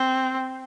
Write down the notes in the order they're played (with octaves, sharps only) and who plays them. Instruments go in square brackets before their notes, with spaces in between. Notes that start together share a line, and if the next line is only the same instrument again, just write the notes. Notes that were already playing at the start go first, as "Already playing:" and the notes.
Already playing: [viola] C4